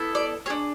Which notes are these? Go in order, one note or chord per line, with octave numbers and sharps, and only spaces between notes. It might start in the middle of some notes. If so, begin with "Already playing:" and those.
Already playing: B3 E4 A4
D5
D4 G#4 C#5